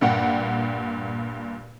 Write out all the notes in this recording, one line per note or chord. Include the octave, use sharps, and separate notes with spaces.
G2 A#2 F#5 G5